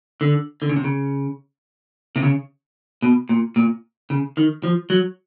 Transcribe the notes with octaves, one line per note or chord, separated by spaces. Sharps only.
D3
D3
C#3
C3
C#3
C3
C#3
B2
A#2
A#2
C#3
D#3
F3
F#3